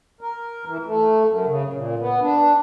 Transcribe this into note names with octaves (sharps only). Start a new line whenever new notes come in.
A#4
E3
A3
F#2
C#3
A#2
B3
D4